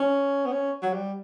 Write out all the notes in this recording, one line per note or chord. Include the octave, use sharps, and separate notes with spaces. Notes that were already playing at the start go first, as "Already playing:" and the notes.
Already playing: C#4
B3
C#4
F#3
G3